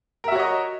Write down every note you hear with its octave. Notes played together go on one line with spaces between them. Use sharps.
F#4 A#4 C#5 D#5 E5